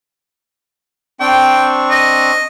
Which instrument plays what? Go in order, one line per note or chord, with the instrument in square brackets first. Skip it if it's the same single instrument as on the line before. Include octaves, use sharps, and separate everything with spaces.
[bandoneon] C4 D4 C#6 [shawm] G5
[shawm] D#5